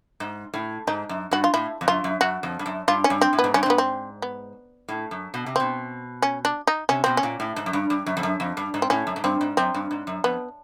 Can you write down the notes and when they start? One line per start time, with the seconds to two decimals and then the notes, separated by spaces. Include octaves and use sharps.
0.20 G#2
0.54 A2
0.87 G#2 D#4
1.09 F#2
1.31 G2 F#4
1.44 F4
1.54 A2 E4
1.81 F2
1.88 F#2 F4
2.04 F#2
2.21 F#2 F#4
2.43 F2
2.59 G2
2.66 F#2
2.88 G2 F4
3.04 C#4
3.10 G2
3.21 C4
3.33 A2
3.39 B3
3.44 G#2
3.54 G2 C#4
3.63 C4
3.66 G#2 B3
3.78 C4
4.22 B3
4.88 A2
5.11 F#2
5.34 B2
5.46 C3
5.56 B2 C4
6.22 C#4
6.45 D4
6.67 D#4
6.89 C3 C#4
7.04 B2 C4
7.17 C#4
7.23 A#2
7.40 A2
7.56 G#2
7.66 F#2
7.73 G2
7.90 G2
8.06 F#2
8.17 F2
8.23 F#2
8.40 F2
8.57 G2
8.74 G#2
8.82 C4
8.90 A2 C#4
9.07 F#2
9.16 G#2
9.24 G2 C4
9.41 G#2
9.57 F#2 C4
9.74 G2
9.91 G#2
10.07 F#2
10.24 F2 B3